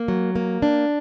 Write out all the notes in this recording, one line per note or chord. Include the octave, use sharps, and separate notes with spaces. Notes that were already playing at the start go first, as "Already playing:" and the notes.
Already playing: A#3
F#3
A#3
D4